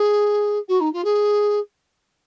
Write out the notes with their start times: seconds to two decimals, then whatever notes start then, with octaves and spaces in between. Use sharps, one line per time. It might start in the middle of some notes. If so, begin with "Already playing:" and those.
Already playing: G#4
0.68 F#4
0.80 D#4
0.93 F4
1.04 G#4